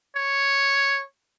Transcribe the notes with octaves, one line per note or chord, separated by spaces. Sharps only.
C#5